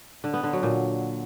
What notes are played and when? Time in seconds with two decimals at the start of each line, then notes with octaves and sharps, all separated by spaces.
0.24 D3
0.34 B3
0.43 D3
0.53 F#3
0.63 A#2